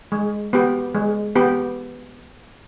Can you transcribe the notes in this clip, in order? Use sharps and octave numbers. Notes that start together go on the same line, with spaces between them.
G#3
B3 G4
G#3
B3 G4